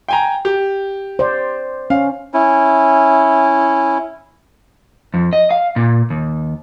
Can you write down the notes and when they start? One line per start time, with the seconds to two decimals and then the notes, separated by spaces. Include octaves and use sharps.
0.08 G5 G#5 A#5
0.45 G4
1.19 C5 D5
1.90 C#4 F5
2.34 C#4 E4
5.14 F2
5.33 D#5
5.51 F5
5.76 A#2
6.10 D#2